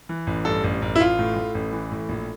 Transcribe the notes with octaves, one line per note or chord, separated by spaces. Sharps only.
E3
A1
G2 A4
A1
A1
E4
A1 F4
A2
A2
A1
E3
A2
A#1